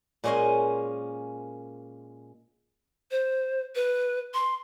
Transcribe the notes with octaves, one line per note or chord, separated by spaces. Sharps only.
A#2 G#3 C#4 C5 D#5 G#5
C5
B4
C6